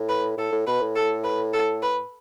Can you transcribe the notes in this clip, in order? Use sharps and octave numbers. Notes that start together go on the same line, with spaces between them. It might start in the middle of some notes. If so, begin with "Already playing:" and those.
Already playing: A2
B4
A2 A4
A2
B2 B4
A2
A4
B4
A4
B4